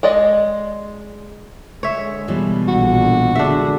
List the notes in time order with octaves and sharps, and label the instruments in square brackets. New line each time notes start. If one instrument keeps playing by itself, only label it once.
[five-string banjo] G#3 D5 D#5
[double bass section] D3 G#3 [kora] C#5 E5
[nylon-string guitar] B2 E3 G3
[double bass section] A#1 D3 [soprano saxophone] F#4
[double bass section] D3 [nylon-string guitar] G#3 G#4 [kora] D4 E5